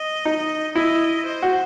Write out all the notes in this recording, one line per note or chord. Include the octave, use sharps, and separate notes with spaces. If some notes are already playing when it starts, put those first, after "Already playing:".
Already playing: D#5
D#4
E4 D#5
C5
F#4